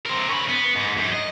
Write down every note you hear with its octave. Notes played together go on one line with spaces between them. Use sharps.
C4 A#4
C#4 B5
B3
G#2
F#2
D#5